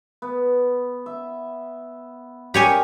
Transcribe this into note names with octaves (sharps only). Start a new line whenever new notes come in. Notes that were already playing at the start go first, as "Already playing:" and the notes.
B3
E5
D4 G4 G#4 A#4 C#5 G#5